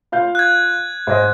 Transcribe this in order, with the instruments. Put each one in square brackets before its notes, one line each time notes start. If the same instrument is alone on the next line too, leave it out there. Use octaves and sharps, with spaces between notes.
[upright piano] F4 F5 G6
[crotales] F#6 G#6
[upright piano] G#2 D#5